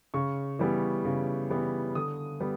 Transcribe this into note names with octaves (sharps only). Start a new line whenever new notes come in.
C#3 C#6
E3 G3 B3
C#3
E3 G3 B3
D3 D#6
G3 B3